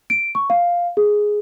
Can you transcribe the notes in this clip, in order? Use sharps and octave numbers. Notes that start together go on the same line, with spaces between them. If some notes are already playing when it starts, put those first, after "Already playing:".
D7
C#6
F5
G#4